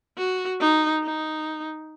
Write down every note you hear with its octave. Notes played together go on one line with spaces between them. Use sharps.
F#4
D#4
D#4